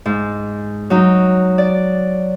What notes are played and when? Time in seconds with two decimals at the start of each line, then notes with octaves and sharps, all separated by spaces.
0.06 G#2
0.90 F#3 D#4
1.58 D5